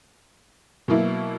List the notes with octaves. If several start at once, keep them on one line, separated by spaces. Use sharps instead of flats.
B2 F#3 A#3 E4